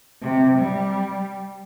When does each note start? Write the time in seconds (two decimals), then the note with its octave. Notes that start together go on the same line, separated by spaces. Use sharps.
0.21 C3
0.58 G3